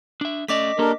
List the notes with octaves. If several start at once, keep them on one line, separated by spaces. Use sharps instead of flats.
D4 E5
A3 C#4 D5 D#5 D6 B6
A#3 D4 G4 A4 A#4